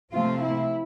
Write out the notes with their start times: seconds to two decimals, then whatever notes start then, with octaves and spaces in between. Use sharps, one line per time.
0.13 C3 F3 A3 C4 F4
0.42 E4